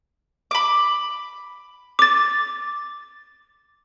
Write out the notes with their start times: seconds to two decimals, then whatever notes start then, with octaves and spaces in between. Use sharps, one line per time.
0.51 B5 D6
1.99 D6 A6